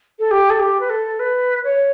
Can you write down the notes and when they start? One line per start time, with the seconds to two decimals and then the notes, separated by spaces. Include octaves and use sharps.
0.19 A4
0.31 G4
0.50 A4
0.59 G4
0.80 B4
0.90 A4
1.19 B4
1.64 C#5